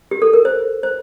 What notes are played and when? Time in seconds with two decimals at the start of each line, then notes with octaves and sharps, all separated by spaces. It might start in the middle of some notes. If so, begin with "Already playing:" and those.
0.11 G4
0.22 A4
0.33 A#4
0.45 C5
0.83 C5